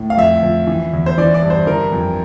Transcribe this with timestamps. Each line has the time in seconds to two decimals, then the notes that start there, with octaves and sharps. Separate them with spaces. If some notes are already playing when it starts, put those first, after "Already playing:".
Already playing: A2
0.10 F5
0.17 F2 E5
0.42 F3
0.67 E3
0.93 E2
1.06 C5
1.18 E3 D5
1.34 D5
1.42 G2
1.50 C5
1.66 E3 A#4
1.92 F2